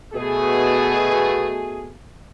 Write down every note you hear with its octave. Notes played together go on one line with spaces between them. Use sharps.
B2 A3 G#4